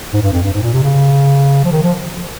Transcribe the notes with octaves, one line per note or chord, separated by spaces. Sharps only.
G#2
G2
F2
G2
G#2
A#2
C3
C#3
F3
D#3
F3